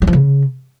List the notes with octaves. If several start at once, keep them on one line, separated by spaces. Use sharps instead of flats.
F#3
F3
C#3